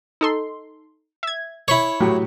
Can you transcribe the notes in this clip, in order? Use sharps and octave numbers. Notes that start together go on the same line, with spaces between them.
D#4 A4 C6
E5 G#6
E4 C#5 B5 C#6
A2 F#3 G4